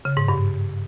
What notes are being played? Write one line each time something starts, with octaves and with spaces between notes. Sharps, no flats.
C#3
G#2
G2